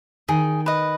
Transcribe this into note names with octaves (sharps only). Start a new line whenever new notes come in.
D#3 G#4
B4 D#5